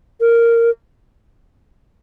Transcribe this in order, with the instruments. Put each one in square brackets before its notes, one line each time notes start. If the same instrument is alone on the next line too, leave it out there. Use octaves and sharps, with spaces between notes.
[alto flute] A#4